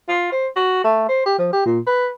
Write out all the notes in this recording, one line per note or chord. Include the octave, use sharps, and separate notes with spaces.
F4
C5
F#4
A3
C5
G4
F3
G4
A#2
B4